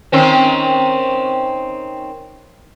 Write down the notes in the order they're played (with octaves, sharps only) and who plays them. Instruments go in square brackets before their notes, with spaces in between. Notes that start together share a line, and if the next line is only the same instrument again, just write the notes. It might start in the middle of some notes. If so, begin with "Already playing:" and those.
[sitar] D#3 C4 C#4